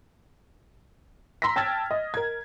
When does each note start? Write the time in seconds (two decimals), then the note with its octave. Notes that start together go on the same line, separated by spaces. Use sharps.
1.42 A#5 C6 E6 A#6 B6
1.56 G5 A5 E6 F6 G#6 A6
1.91 D#5
2.14 A#4 G#6